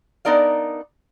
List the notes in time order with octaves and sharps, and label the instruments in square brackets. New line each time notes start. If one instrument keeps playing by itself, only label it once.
[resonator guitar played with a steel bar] B3 D4 D#4 A#4 D5 F5